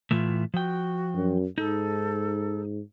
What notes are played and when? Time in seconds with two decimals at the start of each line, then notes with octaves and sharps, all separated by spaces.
0.11 A2 E3 A3 F4
0.54 F3 F#4 G5
1.15 F#2
1.58 G#2 D#4 A4